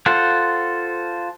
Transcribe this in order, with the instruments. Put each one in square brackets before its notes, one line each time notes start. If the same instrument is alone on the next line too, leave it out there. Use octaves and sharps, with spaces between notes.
[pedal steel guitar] F4 A4 C5 F#5